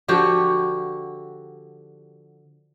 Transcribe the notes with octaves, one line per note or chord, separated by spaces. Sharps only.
D3 F3 F#4 G4